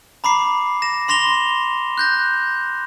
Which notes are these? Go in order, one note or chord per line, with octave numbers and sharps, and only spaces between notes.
A#5 B5 D6 C7
A#6 E7
B5 C6 A#6 F7 G7
F#6 G6 A#6